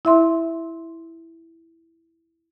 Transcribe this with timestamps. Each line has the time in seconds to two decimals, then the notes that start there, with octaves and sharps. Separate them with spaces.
0.05 E4 E5 C6